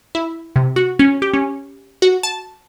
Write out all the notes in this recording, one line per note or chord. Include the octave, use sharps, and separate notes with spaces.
E4
C3
F#4
C#4
G4
C#4
F#4
A5